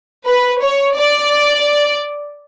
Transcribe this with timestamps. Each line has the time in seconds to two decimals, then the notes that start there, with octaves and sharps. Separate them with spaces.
0.27 B4
0.63 C#5
0.97 D5